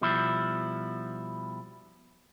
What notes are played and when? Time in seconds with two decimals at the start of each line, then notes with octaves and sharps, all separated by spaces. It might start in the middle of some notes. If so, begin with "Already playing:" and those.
0.01 B2 F3 G3 E4